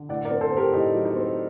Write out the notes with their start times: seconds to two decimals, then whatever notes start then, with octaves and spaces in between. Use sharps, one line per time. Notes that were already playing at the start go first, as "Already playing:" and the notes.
Already playing: D3
0.09 A2 D5 F#5
0.25 A#4 D5
0.31 C4
0.41 A4 C5
0.52 C4
0.57 G4 A#4
0.73 A2 D#4 G4
0.95 F#3
1.05 D#4
1.16 C4